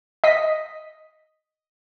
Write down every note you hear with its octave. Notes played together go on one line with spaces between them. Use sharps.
D#5 B6